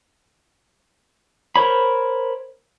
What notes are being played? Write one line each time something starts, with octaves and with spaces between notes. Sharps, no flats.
A#4 C5 C#5 B5